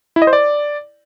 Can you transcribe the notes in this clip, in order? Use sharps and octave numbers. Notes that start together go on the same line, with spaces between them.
E4
D#5
C5
D5